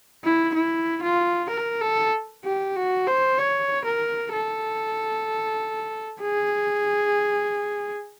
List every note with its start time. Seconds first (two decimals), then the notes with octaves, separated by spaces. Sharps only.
0.24 E4
0.55 E4
1.03 F4
1.50 A#4
1.81 A4
2.45 G4
2.76 F#4
3.07 C5
3.38 C#5
3.85 A#4
4.33 A4
6.22 G#4